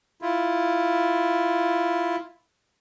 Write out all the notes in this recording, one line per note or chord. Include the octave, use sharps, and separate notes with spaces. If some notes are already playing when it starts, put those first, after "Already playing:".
E4 F4